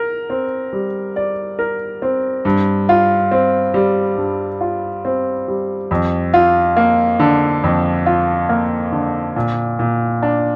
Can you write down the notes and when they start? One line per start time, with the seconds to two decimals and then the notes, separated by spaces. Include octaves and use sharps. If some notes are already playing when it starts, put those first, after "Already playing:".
Already playing: A#4
0.30 C4
0.73 G3
1.16 D5
1.59 A#4
2.02 C4
2.45 G2
2.89 F4
3.31 C4
3.74 G3
4.17 G2
4.61 F4
5.05 C4
5.48 G3
5.91 F2
6.34 F4
6.77 A#3
7.19 D3
7.64 F2
8.06 F4
8.49 A#3
8.92 D3
9.36 A#2
9.79 A#2
10.22 D4